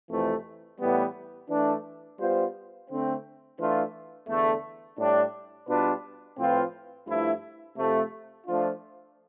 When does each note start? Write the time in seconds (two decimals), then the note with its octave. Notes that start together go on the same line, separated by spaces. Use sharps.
0.10 F2 C3 E3 A3
0.80 A2 E3 G3 B3
1.50 E3 A3 D4
2.20 G3 B3 F4 C5
2.90 D3 A3 C4
3.58 E3 A3 D4 F4
4.29 E2 D3 A3
4.98 A2 G3 D4
5.67 B2 G3 D4 F4 B4
6.37 A2 F3 C4 F4 B4
7.06 G2 F3 A3 E4
7.77 C3 F3 A3
8.46 F3 A3 D4 F4